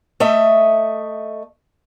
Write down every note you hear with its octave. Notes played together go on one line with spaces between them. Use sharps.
A3 D#5 E5